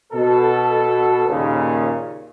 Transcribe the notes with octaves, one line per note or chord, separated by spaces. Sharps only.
B2 A4
D#2 A#2 C#3